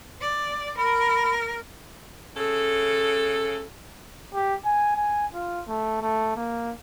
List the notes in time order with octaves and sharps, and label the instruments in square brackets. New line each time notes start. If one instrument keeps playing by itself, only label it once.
[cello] D5
[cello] A#4 [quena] B5
[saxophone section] C#3 A4
[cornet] G4
G#5
G#5
F4
A3
A3
A#3